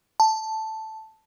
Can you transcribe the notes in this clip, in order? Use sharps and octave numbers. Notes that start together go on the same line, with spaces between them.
A5